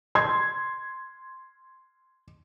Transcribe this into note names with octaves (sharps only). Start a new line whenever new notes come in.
C6 G#6